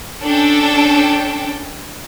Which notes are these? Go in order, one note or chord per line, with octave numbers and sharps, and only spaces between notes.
C#4 D4 A4 G5